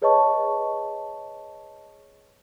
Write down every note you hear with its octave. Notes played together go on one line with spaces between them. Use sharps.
G#4 B4 C#5 D#5 A5 C#6